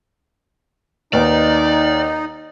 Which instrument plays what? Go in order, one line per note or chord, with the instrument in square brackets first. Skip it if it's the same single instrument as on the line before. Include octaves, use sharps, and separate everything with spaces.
[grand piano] D#2 [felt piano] A#3 B4 F#5 [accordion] D#4 [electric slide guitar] D5